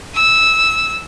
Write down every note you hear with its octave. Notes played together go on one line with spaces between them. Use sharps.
E6